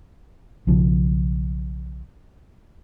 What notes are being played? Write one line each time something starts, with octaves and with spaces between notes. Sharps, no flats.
B1 C#3 F3